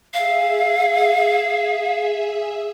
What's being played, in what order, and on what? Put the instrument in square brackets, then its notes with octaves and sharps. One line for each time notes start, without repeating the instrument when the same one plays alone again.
[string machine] G#4 E5 [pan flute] F5